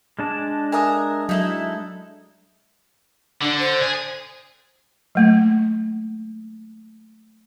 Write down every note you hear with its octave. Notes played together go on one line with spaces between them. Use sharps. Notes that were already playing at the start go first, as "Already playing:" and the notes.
G#3 D4 A5
A#4 E5 G#5 D#6
F#3 D#4 E4 A4
D3 D4
C5
G#4
F#3 A3 A#3